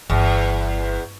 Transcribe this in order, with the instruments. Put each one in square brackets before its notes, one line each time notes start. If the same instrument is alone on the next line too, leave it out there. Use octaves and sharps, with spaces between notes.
[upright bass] G1 [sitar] E2